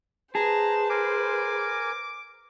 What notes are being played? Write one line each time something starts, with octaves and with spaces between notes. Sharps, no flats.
G#4 B4 C5 A5 A#5
A#4 G#5 D6